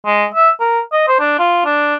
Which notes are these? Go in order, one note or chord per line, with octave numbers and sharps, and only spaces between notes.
G#3
E5
A#4
D#5
C5
D4
F4
D4